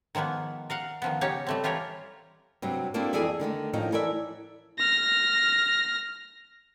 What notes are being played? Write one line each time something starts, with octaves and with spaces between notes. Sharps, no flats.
D#3 F3 G#3 A#3 B3
A#4 F5 F#5
D#3 F3 B3
C#3 C#4 D#4 G4 C#5
G3 A3 C4
E3 F4 G4 A#4 C#5
G2 C3 F#3
A#3 C4 D4 E4 F#4 A4
F2 E3 G#4 A4 D5 E5
D3 D#3 G3 A3
A2 D#3 F3 C#4 D#4
E3 A4 A#4 C#5 D5 E5
F6 A#6